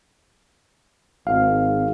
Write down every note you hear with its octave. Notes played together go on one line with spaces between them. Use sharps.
G#1 F5